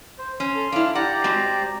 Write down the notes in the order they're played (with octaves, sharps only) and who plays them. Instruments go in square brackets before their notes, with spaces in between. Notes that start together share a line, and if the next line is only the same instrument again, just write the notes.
[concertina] C5
[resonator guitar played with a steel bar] C#4 [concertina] C6
[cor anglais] A4
[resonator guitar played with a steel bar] D4 E4 [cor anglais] F5
[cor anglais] G4 [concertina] D5 A#5 [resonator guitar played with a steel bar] F#5
[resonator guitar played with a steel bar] G#3 C4 F#4